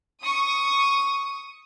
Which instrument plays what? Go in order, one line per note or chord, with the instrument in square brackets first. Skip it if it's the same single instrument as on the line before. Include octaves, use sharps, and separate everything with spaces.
[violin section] C#6 D#6